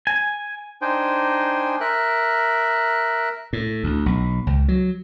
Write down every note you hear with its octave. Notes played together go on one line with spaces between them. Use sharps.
G#5
D4 D#4 C5 G5 G#5
A#4 E5 F#6
A2
D2
B1
C#2
F#3